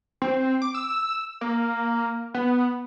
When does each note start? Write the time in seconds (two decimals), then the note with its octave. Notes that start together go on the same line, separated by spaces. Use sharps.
0.22 C4
0.62 D6
0.74 E6
1.41 A#3
2.34 B3